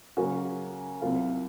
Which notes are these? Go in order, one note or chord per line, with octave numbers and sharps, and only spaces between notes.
C#3 F#3 A#3 C#4 F#4
C2 C3 F#3 A#3 F4